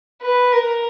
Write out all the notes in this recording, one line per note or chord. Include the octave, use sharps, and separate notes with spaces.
B4
A#4